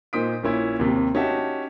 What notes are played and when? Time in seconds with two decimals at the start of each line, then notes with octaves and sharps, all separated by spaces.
0.13 A#2 D#4 C5 D#6 B6 D7
0.43 A#1 A#2 C#4 E4
0.79 D#2 C3
1.15 C#4 D#4 F#4 G4 E5 A5